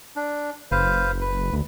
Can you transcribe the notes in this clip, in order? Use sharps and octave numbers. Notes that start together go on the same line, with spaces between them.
D4
F#1 B4 C5 F5
B4
D2